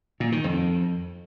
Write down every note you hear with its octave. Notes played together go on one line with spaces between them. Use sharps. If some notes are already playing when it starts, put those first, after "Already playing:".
A#2
D#3
F2